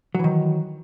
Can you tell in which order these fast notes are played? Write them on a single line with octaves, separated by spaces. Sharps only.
F#3 E3 D#3